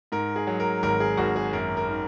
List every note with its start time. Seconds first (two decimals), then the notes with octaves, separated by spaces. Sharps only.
0.12 G#2 A#4
0.36 G#4
0.47 F#3
0.60 A#4
0.83 G#1 A#4
1.00 G#4
1.17 G#1 F#4
1.36 G#4
1.53 F#2 A#4
1.77 A#4
1.89 D#3